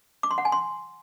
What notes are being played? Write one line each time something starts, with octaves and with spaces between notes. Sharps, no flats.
D6
C6
F#5
G#5
C6